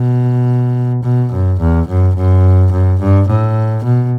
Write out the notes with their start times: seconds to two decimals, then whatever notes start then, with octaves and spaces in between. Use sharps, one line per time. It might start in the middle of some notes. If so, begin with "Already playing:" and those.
Already playing: B2
1.03 B2
1.32 F#2
1.60 E2
1.88 F#2
2.16 F#2
2.72 F#2
3.00 G2
3.28 A2
3.84 B2